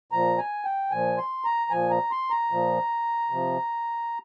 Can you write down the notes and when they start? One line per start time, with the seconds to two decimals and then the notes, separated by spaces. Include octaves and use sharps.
0.12 A#2 F3 A#5
0.38 G#5
0.65 G5
0.91 A#2 F3 G#5
1.18 C6
1.44 A#5
1.70 A#2 F3 G#5
1.91 A#5
2.11 C6
2.30 A#5
2.51 A#2 F3
3.30 C3 F3